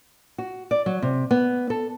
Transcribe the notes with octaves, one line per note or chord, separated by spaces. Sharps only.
F#4
D5
F#3
C3
B3
A4